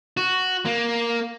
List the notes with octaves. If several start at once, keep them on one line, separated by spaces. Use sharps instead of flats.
F#4
A#3